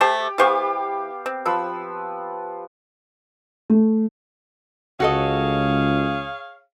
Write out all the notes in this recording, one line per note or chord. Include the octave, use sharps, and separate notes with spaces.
A3 G4 C5 A5
E3 B3 G4 C5 F5 C#6
C4
F3 B4 E6
A3
C#2 F#4 G#4 A4 C#5 D#5 F5